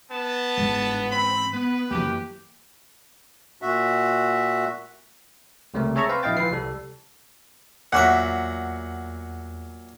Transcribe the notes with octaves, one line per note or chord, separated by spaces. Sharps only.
B3 A5
G1 G#2 E3
C4 B5
B3 B4
F#2 E3 A#3 G4
A#2 F#4 E5
C#2 C3 G3 A3 C4 A#4
G#4 C#5 E5 A5 A#5 C#6
C4 B4 C5 F5
A#1 E4 D#5 F5 G5 A6
E3 F3 F4 B4 C7
C2 G3 A4
E2 A#2 F#3 E5 F#5